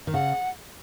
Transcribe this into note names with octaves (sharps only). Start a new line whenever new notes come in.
D#3
C#3 F#5